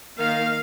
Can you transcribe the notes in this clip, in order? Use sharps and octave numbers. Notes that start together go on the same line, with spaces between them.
D#3 A#3 D#4 F5